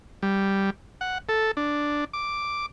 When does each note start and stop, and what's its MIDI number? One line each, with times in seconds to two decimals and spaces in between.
0.23 0.70 55
1.01 1.18 78
1.29 1.51 69
1.57 2.05 62
2.13 2.66 86